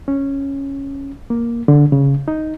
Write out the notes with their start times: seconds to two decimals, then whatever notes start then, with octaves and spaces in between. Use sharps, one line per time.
0.08 C#4
1.30 A#3
1.68 D3
1.92 C#3
2.28 D#4